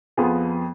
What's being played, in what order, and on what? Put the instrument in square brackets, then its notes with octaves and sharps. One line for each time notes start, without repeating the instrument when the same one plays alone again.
[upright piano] F2 F3 B3 F4 G#4